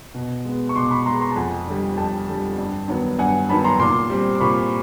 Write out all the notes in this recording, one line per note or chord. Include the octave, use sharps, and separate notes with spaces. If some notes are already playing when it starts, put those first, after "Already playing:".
B2
G#3 B3
C#6
B2 C6 D6
B5 C#6
G#3 B3 A#5 C6
A#5 C6
A5
F2 F#5 G#5
D3 G3
F2 G5 A5
D3 G3
G2
D#3 F#3 B3
G2 F#5 G#5
D#3 F#3 B3 A5 B5
A#5 C6
A#2 C6 D6
G3 C4
D6
A#2 B5 C#6